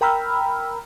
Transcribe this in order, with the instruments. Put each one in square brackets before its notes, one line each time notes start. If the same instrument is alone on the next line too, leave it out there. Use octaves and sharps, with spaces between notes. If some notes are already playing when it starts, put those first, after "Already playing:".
[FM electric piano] A#4 G5 A#5 B5 E6 F6